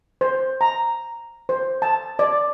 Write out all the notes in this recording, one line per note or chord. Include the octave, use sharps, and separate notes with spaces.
C5
A#5
C5
A5
D5